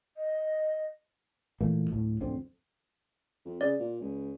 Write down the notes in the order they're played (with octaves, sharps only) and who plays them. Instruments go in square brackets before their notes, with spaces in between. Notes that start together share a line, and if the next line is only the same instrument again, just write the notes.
[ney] D#5
[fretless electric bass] A#2 E3 A3 A#3
D1 A2
D1 F2 D3 C4
[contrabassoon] F2
[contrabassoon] C#3 [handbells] D5
[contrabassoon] A#2
C#2